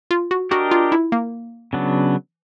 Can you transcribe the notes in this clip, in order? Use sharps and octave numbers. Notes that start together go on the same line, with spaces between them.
F4
F#4
D4 F#4 G4 A#4 D#5
F4
E4
A#3
C#3 F#3 B3 D4